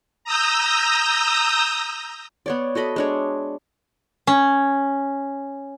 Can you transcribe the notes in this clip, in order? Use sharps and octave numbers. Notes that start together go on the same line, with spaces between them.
A#5 D#6 E6 G6 A#6
B3 C#5 D5
F#4 A4 D#5 B5
G#3 D4 C#5
C#4